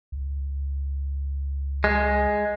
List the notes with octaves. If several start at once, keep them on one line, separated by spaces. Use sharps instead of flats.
C#2
G#3